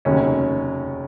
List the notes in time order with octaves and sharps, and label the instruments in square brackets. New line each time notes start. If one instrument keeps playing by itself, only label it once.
[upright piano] F1 D#2 C#3 F#3 C#4